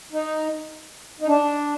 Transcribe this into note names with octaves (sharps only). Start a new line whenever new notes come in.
D#4
D#4
D4